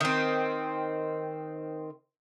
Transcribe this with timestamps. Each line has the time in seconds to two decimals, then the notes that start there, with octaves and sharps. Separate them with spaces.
0.01 D#3 C4